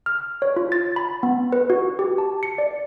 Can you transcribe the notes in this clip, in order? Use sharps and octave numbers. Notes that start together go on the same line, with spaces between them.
F6
C#5
F4
A6
B5
B3
B4
F#4
G4
A5
C#7
D5